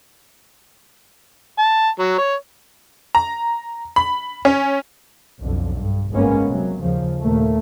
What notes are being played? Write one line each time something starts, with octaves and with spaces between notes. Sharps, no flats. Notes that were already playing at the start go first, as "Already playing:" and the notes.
A5
F#3
C#5
A#5
B5
C#4
B1 F2 D3
G2
G1 G#2 G#3 A#3 B3 C#4
C3 F#3
D#2 C#3 F3
D#2 A#2 A3 A#3